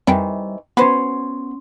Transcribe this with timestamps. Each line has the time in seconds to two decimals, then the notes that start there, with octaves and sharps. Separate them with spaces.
0.07 F2 C3 D#3 E3 G3 G5
0.77 B3 C#4 F#4 B4 C5 C6